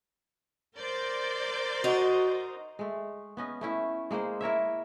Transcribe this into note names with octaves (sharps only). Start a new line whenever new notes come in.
A#4 C5 D5 G6 A6
D#4 F#4
G#3 A3
B3 C#4 D#5
A3 C#4 E4
G#3 A#3 G#4 C5
E4 A#4 C#5 E5